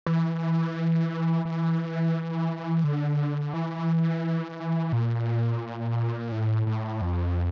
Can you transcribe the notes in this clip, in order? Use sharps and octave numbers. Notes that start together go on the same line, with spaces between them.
E3
E3
D3
E3
A#2
A2
A2
F2